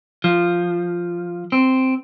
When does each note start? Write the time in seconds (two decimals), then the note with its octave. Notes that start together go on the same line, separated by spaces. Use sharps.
0.24 F3
1.52 C4